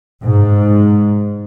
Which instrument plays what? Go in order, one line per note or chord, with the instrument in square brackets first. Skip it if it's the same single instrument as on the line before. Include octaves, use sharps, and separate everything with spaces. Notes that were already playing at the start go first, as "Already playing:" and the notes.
[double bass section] G#2